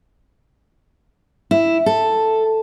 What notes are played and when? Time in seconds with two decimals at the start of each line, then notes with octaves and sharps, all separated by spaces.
1.51 E4
1.86 A4